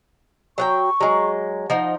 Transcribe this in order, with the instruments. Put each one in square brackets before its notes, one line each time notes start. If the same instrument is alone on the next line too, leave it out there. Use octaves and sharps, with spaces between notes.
[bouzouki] F#3 F#5 G5 [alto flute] C#6
[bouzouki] F#3 G#3
[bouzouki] F3 D#4 [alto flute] F#5